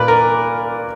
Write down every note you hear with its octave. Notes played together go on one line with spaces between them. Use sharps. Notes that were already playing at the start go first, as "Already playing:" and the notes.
Already playing: A#2 A#3 B4 D5
A#4